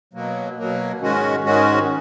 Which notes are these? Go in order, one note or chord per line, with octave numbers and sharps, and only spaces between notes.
B2 F#3 A#3
B2 F#3 A#3
G#2 D#3 G#3 C#4 F#4
G#2 D#3 G#3 C#4 F#4